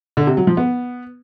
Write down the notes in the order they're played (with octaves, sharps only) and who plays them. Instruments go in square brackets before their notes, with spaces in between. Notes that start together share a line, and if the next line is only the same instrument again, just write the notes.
[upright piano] D3
C3
F#3
F3
B3